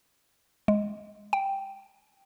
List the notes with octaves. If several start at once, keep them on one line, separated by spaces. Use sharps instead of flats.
G#3
G5